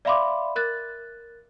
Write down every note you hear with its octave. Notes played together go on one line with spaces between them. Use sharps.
D5 E5 F5 B5 C6 D6
A#4 F#6 A6